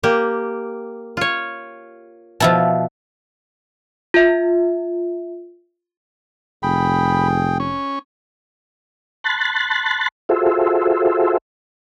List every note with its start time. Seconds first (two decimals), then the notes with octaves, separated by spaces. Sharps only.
0.03 A#3 G4
1.17 F4 C#5
2.40 B2 F3 E4 A5
4.14 F4 E5
6.63 F1 G#4 G5 B5
7.60 C#4 C#6
9.24 A5 B5 C6 F#6 A6
10.29 F4 F#4 G#4 A4 C5 E5